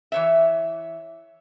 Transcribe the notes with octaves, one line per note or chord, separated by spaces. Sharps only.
E3 C#5 E5